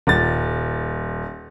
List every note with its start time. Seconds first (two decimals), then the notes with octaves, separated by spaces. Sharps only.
0.07 D#1 A6